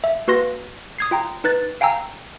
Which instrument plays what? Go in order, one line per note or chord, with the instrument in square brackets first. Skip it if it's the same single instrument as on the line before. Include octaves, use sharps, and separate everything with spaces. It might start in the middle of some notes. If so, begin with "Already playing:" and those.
[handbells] E5
A#3 F#4 B4 C6 A#6
D#6 G#6 C7
F4 G5 A#5
D#4 B4 F#6 A6
F5 G5 G#5 A#5 E6